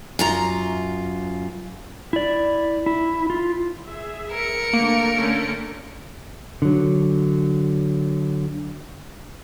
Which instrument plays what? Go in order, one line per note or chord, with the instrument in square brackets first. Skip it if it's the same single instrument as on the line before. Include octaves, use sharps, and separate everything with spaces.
[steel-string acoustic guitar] F#2 F4 A#5
[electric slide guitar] E4 D5
E4
F4
[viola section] G#4 E5
[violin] A#4 C#7
[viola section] D3 A3 [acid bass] A#3
[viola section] D3 A3 C#4
[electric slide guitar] D3 F#3